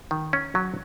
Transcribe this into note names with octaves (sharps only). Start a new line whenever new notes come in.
D#3
C#4
F#3